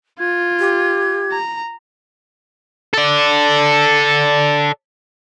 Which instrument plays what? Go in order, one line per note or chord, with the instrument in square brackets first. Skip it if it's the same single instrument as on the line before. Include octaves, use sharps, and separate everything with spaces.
[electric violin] F4 [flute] G#6
[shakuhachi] G4
[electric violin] A#5
[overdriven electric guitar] A4 D5